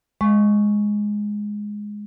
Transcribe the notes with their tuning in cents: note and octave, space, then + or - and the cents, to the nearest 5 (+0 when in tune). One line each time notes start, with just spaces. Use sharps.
G#3 +0 C#6 +0